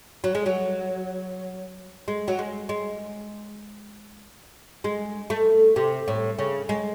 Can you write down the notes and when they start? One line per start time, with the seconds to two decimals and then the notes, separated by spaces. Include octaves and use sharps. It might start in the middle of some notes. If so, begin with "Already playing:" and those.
0.24 F#3
0.35 G#3
0.46 F#3
2.08 G#3
2.28 F#3
2.39 G#3
2.69 G#3
4.84 G#3
5.30 A3
5.76 C3
6.08 A2
6.39 C#3
6.69 G#3